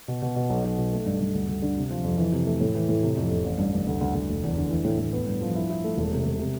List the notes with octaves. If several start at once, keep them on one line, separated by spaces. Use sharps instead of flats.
B2
B2
B2
B1
B1
B2
A3
G2
G2
D2
D2
D3
C3
F3
F2
E3
C3
A3
A2
E3
A2
C3
F2
F1
A1
G2
G2
D2
D2
D2
F1
E2
D3
E3
A2
A2
B3
G2
F3
E4
E4
A3
E1
C3
E1
C3